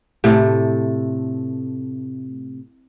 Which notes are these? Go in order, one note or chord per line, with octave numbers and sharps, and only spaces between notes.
A2 C3 A3